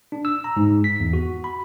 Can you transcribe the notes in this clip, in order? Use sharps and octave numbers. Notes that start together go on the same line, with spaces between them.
D4
E6
A#5
G#2
B6
E2
F#4
B5